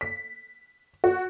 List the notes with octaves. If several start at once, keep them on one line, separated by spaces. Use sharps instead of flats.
B6
F#4